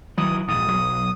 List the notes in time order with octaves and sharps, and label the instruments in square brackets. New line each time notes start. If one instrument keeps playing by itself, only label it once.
[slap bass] D#3 E3 F#3 [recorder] D#6
[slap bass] A#1 G#2 [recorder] D#6
[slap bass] B1 F#3